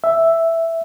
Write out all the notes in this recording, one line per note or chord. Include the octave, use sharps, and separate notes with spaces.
E5